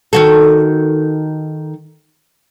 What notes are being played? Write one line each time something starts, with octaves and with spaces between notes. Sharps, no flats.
D#3 F#4 A4